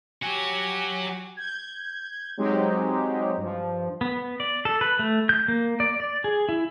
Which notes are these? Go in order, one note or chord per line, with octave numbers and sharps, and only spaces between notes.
F#3 F#4 G4 G#5
G6 G#6
F#3 G#3 C4 D#4 G4
G2 F3
B3
D5
A4
B4
A3
G6
A#3
D5
D5
G#4
E4